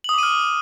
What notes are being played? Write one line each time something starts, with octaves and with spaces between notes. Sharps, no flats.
D6 D#6 F6 D#7 F#7